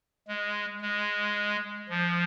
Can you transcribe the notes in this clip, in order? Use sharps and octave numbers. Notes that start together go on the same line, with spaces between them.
G#3
G#3
F3